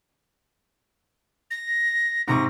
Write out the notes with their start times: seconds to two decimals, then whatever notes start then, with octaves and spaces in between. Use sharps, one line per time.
1.51 A#6
2.28 G#2 C3 C#6 A#6